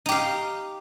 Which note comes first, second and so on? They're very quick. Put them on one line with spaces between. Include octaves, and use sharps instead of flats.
D#4 G4 F5